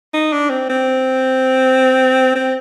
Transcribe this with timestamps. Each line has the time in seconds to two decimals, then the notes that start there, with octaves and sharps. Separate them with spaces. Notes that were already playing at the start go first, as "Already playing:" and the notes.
0.13 D#4
0.32 D4
0.50 C4
0.70 C4
2.35 C4